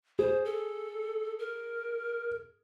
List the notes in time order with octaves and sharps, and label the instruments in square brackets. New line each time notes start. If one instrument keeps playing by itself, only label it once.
[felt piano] G#4 [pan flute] C5
[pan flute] A4
A#4